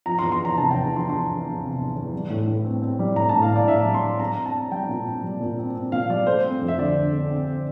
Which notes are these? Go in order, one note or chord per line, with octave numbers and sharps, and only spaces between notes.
F3 A#5
C6
E2
C6
E2 A#5
C3 A5
E2 G5
A#5
F3 C6
E2 C6
E2
E2
C3
E2
E2
G3
A2
A2
C4
C4
G3
A2 A#5
A2 A5
F5
A2 D5
A2 E5
G3
C6
G3
G3 A#5
C4
A5
C4
G3 G5
A#2
C4
G3
A#2
C4
C4
A#2 F5
G3 D5
A3 C5
C4
F2
E5
D3 D5
D3
D3
C4
C4